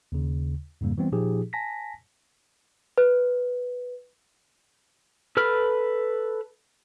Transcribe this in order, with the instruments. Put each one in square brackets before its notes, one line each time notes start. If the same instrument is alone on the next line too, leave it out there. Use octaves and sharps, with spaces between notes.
[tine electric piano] D#2 C#3
F2 G#2 C#3 G3 A#3
E3 G3 B3 C4
A#2 F3 D#4 G4 G#4
G#5 A5 A#6 B6
[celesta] B4
[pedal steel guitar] A4 B4 B5 F6